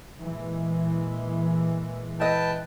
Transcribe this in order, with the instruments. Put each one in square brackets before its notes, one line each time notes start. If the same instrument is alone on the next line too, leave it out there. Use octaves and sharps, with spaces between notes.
[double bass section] A#2 E3 G#3
[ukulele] E4 D#5 [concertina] B4 G5 A5